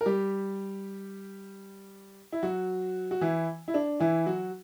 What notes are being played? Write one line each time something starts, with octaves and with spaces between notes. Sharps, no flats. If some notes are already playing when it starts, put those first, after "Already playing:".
A#4
G3 G4
E4
F#3 F#4
F#4
E3 E4
E4
D4
E3 E4
F#3 F#4